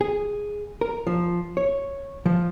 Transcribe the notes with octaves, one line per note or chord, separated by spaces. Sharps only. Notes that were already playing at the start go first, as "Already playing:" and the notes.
G#4
A#4
F3
C#5
F3